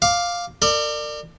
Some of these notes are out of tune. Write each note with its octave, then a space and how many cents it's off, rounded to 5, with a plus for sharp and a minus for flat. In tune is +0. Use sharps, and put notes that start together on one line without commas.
F5 +5 D6 +0
A#4 -35 D5 +25